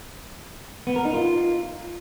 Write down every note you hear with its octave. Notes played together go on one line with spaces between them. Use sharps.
B3
A#4
D#4
F4